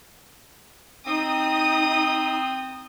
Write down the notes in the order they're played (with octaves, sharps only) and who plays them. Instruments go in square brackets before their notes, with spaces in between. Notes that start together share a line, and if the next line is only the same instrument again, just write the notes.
[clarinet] C4 [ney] D#4 [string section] D#6